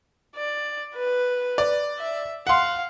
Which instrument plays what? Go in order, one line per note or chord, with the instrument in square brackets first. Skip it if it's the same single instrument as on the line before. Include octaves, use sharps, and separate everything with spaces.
[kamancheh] D5
B4
[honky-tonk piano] D5
[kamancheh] E5
[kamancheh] F5 [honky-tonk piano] F#5 C6